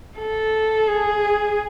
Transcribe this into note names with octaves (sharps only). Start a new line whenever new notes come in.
A4
G#4